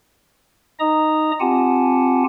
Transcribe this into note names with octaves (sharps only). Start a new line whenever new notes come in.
D#4 D#5 A#5 D#6
C4 F4 G4 F#5 G#5 A5